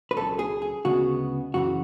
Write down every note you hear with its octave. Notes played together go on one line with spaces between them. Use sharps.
B4
C#2 C#3 F#3 A4
G#4
G#4
D2 C#3 G#3 B3 F#4
F#2 C#3 E3 F#4